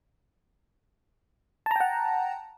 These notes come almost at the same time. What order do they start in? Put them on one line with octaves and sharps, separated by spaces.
A5 A#5 G5 F#5